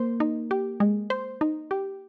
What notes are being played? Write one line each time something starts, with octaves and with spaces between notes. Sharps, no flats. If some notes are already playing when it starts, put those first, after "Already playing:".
Already playing: A#3 C5
D#4
G4
G#3
C5
D#4
G4